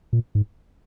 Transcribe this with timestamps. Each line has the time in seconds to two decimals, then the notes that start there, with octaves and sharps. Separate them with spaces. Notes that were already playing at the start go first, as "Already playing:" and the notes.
0.13 A#2
0.35 G#2